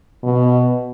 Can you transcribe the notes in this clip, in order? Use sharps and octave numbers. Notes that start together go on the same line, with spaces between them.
B2